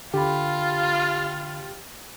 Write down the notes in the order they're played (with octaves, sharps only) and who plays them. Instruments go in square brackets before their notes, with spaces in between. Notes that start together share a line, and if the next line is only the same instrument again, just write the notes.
[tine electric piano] D3 B5 [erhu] F4 [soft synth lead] G4